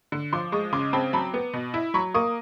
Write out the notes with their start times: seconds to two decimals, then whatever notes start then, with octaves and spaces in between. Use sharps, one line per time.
0.12 D3
0.33 F3 C6 D6
0.52 G#3 C#6 D#6
0.72 C#3 C6 D6
0.93 C4 A5 B5
1.13 F#3 A5 B5
1.34 B3
1.54 B2
1.74 E4
1.94 F#3 B5 C#6
2.14 A#3 C#6 D#6